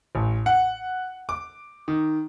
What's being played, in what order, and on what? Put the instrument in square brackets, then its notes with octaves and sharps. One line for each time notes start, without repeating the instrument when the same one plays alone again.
[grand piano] A1
F#5
D6
D#3